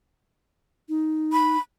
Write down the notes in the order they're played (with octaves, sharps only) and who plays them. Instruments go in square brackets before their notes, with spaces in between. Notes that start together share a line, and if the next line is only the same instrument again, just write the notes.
[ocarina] D#4
[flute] B5